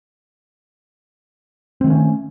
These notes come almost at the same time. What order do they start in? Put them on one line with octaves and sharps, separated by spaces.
C4 D#3 A3 C#4